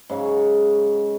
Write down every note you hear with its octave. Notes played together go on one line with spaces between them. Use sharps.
G#2 C#3 F#3 F#5